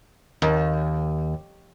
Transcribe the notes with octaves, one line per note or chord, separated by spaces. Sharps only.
D#2